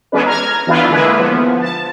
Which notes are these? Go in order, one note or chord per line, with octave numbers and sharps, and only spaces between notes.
E3 G#3 B3 C#4 D4 B4
A#5 F6 G#6
E3 B3 D4 E4 F4 B4
D3 G#3 A#3 E4 G#4 B4
F3 B3
A5